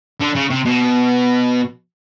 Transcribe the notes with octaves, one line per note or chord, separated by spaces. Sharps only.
D3
C#3
C3
B2